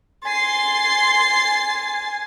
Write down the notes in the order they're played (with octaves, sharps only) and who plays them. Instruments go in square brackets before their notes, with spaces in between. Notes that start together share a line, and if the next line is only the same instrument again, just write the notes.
[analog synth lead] G#5 [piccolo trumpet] C6 [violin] A6 C7